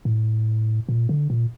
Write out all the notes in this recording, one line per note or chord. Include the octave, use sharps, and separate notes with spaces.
A2
A#2
D3
A#2